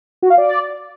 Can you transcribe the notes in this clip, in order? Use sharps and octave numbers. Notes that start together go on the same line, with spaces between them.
F#4
F5
D5